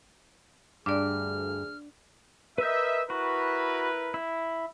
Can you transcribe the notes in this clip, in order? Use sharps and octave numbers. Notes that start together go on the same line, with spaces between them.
D2 G2 D4 G#4 D5 F6
A#4 B4 D#5 E5 G6
E4 F#4 A#4 B4
E4